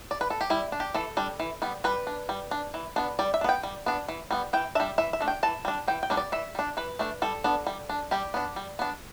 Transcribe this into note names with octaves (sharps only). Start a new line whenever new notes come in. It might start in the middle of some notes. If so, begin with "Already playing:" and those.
D5
B4
A4
G4
G3 E4
D4
G4
E3 A4
G3 D4
E3
G3 B3
G3 B4
D4
G3
D4
E3
B3 D4
G3 D5
E5
D4
B3 G5
G3
B3 D4
E3
G3 B3
E3 G5
G3 D4 E5
E3 E5
E5
A3 D4
G5
E3 A5
G3 D4
E3 G5
G5
G3 B3 D4
D5
E3 E5
G3 D4
E3 B4
A3 D4
G3 A4
B3 D4
G3
D4
G3 G4
B3 D4
G3
B3 D4